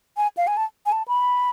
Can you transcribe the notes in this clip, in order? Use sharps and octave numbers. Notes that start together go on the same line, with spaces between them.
G#5
F5
G#5
A5
G#5
A5
B5